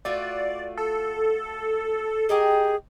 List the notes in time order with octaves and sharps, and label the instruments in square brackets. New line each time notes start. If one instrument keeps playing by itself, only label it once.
[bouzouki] A3 F4 F#4 [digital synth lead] D5
[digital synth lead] A4
[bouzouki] G4 A#4 D#5 [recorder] G#4